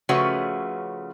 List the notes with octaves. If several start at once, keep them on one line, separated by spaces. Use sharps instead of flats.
C#3 F3 A3 C#4 F#4 B4